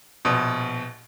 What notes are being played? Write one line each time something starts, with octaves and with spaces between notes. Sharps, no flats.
A#1 B2